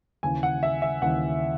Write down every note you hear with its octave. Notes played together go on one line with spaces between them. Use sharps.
D#2 C#3 E3 G#5
F#5
E5
E5
D#2 C#3 E3 F#5